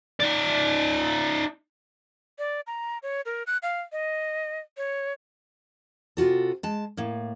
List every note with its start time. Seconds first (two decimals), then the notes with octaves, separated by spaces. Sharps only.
0.20 D#4 D5
2.39 D5
2.67 A#5
3.03 C#5
3.26 A#4
3.47 F#6
3.63 F5
3.92 D#5
4.77 C#5
6.17 C3 F4 F#4 A4
6.63 G#3 A5
6.97 A2 A#3